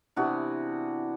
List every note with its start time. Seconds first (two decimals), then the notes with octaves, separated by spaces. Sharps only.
0.16 C3 E3 B3 D4 F#4